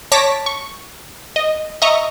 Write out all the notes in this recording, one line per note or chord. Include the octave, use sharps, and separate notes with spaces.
C#5 A5 D6 A#6 B6
C#6
D#5
D#5 E5 A#5 C#6